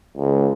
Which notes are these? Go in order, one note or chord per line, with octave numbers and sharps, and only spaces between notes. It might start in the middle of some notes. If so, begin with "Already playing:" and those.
C#2